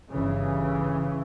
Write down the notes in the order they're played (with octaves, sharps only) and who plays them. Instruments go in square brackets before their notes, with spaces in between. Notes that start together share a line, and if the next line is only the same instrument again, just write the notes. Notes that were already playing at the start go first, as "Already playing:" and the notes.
[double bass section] G1 G2 C#3 E3